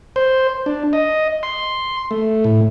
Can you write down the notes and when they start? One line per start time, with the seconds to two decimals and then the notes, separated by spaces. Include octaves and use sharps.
0.16 C5
0.66 D4
0.93 D#5
1.43 C6
2.11 A3
2.44 A2